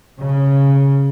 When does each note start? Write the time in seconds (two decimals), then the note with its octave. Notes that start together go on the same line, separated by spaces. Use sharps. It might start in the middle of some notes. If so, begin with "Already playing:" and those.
0.21 C#3